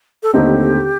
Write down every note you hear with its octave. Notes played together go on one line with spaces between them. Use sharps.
A4
D#2 D3 A3 C4 D#4 G4